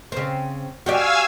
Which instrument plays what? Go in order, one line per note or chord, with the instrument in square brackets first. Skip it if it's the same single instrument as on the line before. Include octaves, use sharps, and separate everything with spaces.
[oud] C#3 C4
[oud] F#4 G4 D5 [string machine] F5 G#5 E6